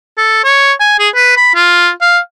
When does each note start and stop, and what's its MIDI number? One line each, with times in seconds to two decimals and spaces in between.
0.18 0.40 69
0.44 0.73 73
0.80 0.95 80
0.99 1.09 68
1.15 1.36 71
1.37 1.51 83
1.55 1.90 65
2.01 2.19 77